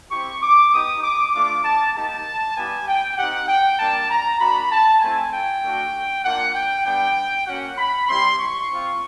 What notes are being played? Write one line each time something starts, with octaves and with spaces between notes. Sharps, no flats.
C4 E4 G4 C#6
D6
B3 D#4 G4 D#6
D6
A3 D4 F4 D6
A5
A#3 D#4 G4 A5
G3 B3 E4 G4 G#5
G5
C4 D#4 G4 F#5
G5
G3 A#3 D4 A5
A#5
A#3 D4 F#4 B5
A5
A3 C4 E4 G#5
G5
A3 D4 F#4
A#3 D4 F4 F#5
G5
G3 B3 D4 G5
A#3 C#4 F#4 F#5
B5
G3 C4 E4 G4 C6
C#6
C4 F4